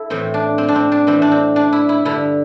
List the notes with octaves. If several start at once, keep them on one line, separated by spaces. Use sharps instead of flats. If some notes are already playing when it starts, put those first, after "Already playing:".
Already playing: E4 A4
A2 E3 C4
D4
C4
D4
C4
D4
A2 E3 C4
D4
C4
D4
E4
E4
G2 D3 E4